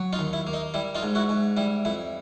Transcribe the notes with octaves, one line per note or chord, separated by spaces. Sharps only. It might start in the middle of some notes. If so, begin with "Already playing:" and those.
Already playing: F#3
D#4 F4
D#2
E4
A#3
D#4
G3 E4
D#4 F4
G#2
E4 F#4
G#2
G3 E4
F2 E4